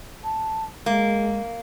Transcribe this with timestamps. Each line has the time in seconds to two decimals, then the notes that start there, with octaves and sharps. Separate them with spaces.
0.24 A5
0.86 G#3 A#3